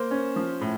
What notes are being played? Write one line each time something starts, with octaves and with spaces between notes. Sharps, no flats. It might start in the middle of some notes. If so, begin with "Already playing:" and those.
Already playing: A#3 C5
C#4
F3
A2